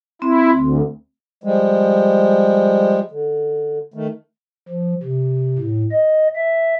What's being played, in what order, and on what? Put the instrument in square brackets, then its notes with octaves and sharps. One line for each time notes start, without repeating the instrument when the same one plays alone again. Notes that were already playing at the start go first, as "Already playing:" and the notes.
[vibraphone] C4 [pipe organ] E4
[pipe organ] D2
[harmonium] F3 G3 G#3
D3
D#3 A3
[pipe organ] F3
C3
A2
D#5
E5